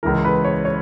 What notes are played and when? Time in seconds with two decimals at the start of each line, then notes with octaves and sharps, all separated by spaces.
0.03 C#2 C#3 E3 A#4
0.25 B4
0.44 C#5
0.65 C#5